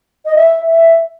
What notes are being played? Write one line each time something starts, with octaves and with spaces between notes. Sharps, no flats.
D#5
E5
E5